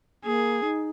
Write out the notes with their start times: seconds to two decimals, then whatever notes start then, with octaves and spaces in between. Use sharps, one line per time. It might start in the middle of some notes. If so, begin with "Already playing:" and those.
0.25 A#3 G#4
0.62 D#4